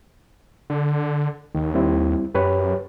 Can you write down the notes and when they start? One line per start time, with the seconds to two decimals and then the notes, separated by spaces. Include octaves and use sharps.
0.70 D3
1.55 D#2 D#3
1.75 G3 C4 E4
2.35 F#2 G4 B4 C#5